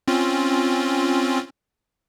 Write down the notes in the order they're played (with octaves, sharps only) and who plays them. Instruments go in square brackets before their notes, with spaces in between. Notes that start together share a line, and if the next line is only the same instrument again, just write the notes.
[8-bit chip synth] C4 C#4 F4